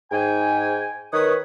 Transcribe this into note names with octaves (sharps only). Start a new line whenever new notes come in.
G#2 G5 G#5
D#3 B4 C#5 D#6